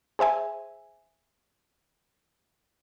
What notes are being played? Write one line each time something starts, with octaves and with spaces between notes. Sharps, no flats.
G#4 C5 E5 G#5